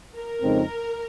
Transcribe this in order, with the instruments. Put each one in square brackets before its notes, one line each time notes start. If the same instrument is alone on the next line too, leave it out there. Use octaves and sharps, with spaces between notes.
[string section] A#4
[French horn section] F2 C#3 G#3 C4 D#4